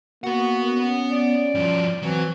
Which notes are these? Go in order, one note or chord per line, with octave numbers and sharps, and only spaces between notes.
A#3 B3 F#4 F#5
C#4
D5
G2 F3
E3 F#3 C4